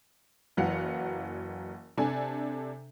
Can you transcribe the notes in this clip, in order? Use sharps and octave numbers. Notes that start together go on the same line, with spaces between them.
F#1 E3 F#3 F5 F#5
C3 D4 A4 G#5